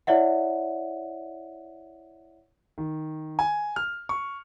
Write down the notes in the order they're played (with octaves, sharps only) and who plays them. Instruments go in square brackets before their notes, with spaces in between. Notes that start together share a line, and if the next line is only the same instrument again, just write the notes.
[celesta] E4 C#5 D5 E5 F#5
[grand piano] D#3
G#5
F6
C#6